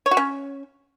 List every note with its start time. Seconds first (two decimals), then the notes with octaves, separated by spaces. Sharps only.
0.06 C#5
0.11 F#4
0.17 C#4